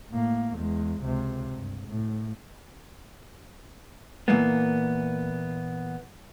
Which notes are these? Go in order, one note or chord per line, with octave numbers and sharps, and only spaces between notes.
A2 A#3
E2 G#3
C#2 C3
G2
A2
A#2 E3 F3 G#3 A#3 B3